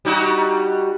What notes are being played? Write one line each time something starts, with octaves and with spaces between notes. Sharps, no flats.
G3 D#4 F#4